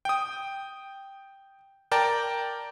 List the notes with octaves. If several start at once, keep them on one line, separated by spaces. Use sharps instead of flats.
G5 D#6
A#4 D5 G5 A5 A#5